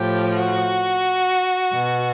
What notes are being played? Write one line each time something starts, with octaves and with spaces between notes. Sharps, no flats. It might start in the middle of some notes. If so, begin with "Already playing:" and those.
Already playing: A2 F3 G4
F#4
B2